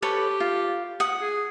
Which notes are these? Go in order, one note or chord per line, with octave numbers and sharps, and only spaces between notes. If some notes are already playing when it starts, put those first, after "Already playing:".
G4 A4 B4 C#5
F4
F#5 D#6
G#4